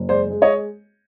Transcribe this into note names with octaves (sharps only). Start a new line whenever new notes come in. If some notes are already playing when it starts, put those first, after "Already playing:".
Already playing: F#1
G#3 C5 D5
G#3
C#5 D#5